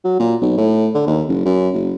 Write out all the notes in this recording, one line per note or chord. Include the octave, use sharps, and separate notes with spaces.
F#3
A#2
B1
A2
D3
D#2
F#1
F#2
F#1